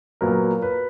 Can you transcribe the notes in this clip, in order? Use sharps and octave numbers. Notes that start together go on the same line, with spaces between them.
A#2 F#3 B3 A#4
B4